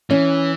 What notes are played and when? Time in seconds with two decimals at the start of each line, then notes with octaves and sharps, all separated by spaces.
0.10 E3 C#4